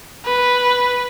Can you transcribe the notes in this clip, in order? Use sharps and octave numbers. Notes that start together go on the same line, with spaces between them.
B4